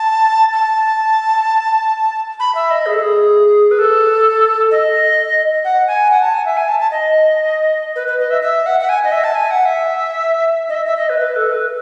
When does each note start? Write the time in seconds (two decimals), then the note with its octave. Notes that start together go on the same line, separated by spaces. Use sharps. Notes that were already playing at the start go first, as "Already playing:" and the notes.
Already playing: A5
0.54 A5
2.40 B5
2.55 E5
2.71 D#5
2.86 G#4
2.93 A4
3.00 G#4
3.71 B4
3.79 A4
4.71 D#5
5.64 F#5
5.87 G#5
6.11 F#5
6.22 A5
6.34 G#5
6.46 E5
6.57 G#5
6.68 A5
6.80 A5
6.91 D#5
7.96 B4
8.08 B4
8.20 D#5
8.31 E5
8.42 E5
8.66 F#5
8.80 F#5
8.89 G#5
9.04 D#5
9.12 E5
9.24 A5
9.35 G#5
9.51 F#5
9.65 E5
10.69 D#5
10.75 E5
10.86 E5
10.97 D#5
11.09 B4
11.20 B4
11.36 A4
11.52 B4